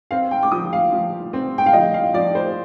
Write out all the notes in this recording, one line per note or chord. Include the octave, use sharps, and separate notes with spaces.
C4 F5
G5
D6
F3 D#6
F5
F3
C4
G5
F5
F3 D#5
F5
F3 D5
C5